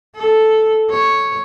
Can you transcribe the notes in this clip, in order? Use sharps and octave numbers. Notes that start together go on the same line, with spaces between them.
A4
C#5